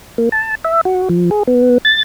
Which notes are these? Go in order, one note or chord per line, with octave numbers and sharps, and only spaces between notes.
A#3
A5
E5
F#4
F3
G#4
B3
A6